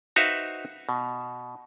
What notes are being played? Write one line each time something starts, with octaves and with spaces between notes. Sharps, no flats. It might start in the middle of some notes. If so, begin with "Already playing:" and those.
D#4 F#4 B4 C5 E5 F5
B2